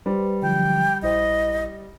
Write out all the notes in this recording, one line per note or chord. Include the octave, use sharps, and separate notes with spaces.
G3 B4 C5
D3 F3 F#3 G5
A#1 E4 C5 D#5